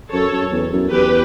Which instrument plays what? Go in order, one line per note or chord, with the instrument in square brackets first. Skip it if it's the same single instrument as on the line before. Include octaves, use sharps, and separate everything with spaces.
[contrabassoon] F#2 [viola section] A4 C#5
[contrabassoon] F#2
E2
F#2
[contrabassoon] E2 [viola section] G4 B4